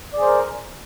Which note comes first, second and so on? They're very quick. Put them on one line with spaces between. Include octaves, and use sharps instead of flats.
D5 G#4 C5 A#4